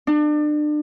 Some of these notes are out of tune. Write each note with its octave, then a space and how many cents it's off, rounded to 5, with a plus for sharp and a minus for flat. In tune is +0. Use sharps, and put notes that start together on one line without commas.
D4 +35